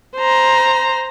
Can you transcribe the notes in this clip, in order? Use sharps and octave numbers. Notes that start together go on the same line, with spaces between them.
C5 A#5